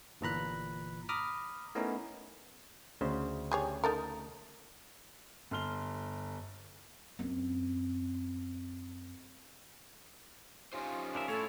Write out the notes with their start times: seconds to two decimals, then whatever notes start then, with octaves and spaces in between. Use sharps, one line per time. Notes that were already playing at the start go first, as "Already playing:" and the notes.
0.21 G1 A#2 E3 A#5 B5 F#6
1.09 A#5 B5 D6 D#6 F6
1.75 A3 B3 C#4 D#4 E4 A#4
3.01 D2 C#3 C5
3.52 G4 G#4 C#5
3.84 D#4 A4 A#4
5.51 G1 C6 F6 G7
7.19 F#2 C4
10.73 C#4 D#4 F4 G4 C5
11.15 D4 A#4 E5
11.28 A2 A3 E4 A4 C#5